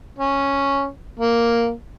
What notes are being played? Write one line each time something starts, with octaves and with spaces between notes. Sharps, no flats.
C#4
A#3